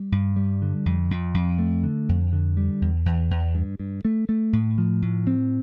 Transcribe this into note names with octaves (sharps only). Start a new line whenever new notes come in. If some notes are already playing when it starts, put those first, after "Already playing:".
Already playing: G3
G2
G3
D3
F2
F2
F2
A3
D3
F2
D3
G3
E2
E2
E2
G2
G2
A3
A3
A2
F3
A2
C4